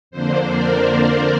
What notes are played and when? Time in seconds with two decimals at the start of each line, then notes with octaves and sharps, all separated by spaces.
0.11 F2 D3 A#3 D4 C5
0.50 A#4 D5
0.90 A#4